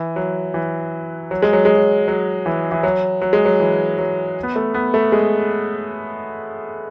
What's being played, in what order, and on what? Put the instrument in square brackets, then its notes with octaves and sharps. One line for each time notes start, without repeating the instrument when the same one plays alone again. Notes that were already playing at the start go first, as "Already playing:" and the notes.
Already playing: [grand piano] E3
F#3
E3
F#3
G#3
F#3
G#3
F#3
F#3
E3
E3
F#3
F#3
G#3
F#3
E3
F#3
B3
A3
B3
A3
G#3